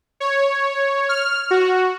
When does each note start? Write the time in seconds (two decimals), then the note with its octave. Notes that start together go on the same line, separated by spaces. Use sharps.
0.20 C#5
1.09 F6
1.51 F#4